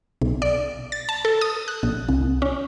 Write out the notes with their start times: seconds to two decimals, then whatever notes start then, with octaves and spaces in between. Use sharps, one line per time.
0.22 B1
0.42 D5
0.92 A6
1.09 A5
1.25 A4
1.41 D#6
1.68 F#6
1.83 A#1
2.09 C2
2.42 C#4